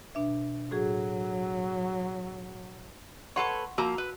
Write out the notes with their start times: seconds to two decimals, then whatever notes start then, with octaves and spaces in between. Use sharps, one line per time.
0.15 B2 D4 E5
0.71 A2 F#3 F#4 G#4
3.36 A4 B4 C#5 F#5 C6 C#6
3.78 F3 A#3 F#4 A#4 A#5 E6
3.98 B4